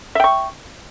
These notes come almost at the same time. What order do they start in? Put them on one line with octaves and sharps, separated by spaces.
E5 G5 C#6